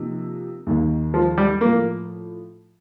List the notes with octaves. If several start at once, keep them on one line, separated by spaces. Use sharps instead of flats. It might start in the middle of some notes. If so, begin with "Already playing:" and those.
Already playing: C3 F3 A#3 D#4
D#2 D#3 A#3
F3
G3
A2 F3 A#3